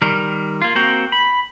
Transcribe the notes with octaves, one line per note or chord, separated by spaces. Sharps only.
D#3 G3 A#4
A#3 F4
A#3 C4 F#4 G5 A#5
B5